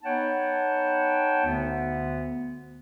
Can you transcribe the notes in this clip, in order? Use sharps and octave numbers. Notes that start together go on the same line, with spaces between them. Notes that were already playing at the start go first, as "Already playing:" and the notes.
B3 D#4 C#5 F#5 G5 A5
D2 D3 B3